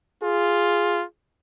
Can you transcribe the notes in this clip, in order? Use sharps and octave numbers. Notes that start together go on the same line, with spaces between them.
F4 G#4